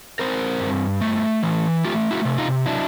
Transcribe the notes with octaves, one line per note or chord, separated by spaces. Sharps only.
C4 A#4 C5
G2
A3
E3
A3 F4 G4
E4 F#4
C3
D#4 F4
F#3 D4 E4